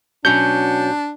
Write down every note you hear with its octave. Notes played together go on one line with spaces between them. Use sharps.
B2 F#3 C#4 D4 G6